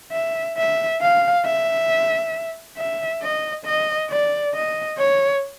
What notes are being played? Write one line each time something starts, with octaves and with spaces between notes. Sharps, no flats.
E5
E5
F5
E5
E5
D#5
D#5
D5
D#5
C#5